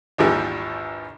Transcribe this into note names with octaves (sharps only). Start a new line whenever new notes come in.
A#1 D#2 G#2 E3 F3 G3